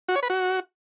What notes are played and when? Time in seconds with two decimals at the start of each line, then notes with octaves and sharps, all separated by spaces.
0.09 F#4
0.16 C#5
0.23 B4
0.30 F#4